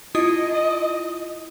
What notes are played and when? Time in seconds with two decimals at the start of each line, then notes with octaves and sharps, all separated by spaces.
0.15 E4 F4 D#5 D#6